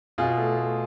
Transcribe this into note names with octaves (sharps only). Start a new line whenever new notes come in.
B2 F4 G#4
A3
A3